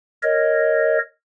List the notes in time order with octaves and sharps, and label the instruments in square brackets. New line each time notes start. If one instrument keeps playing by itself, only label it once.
[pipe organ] A#4 C#5 D#5